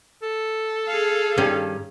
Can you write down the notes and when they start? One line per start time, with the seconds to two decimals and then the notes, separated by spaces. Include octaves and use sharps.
0.22 A4
0.87 G#4 F5
1.38 G2 D#3 C#4